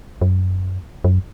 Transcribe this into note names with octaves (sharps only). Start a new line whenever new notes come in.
F#2
F#2